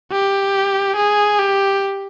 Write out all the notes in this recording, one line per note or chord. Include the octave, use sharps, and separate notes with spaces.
G4
G#4
G4